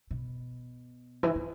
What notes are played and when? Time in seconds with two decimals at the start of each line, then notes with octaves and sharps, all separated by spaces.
0.11 B2
1.23 E3
1.35 D#3